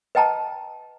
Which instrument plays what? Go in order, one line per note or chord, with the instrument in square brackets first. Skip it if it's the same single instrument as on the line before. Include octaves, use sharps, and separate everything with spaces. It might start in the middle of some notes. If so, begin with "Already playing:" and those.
[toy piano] B4 D#5 G5 A5 A#5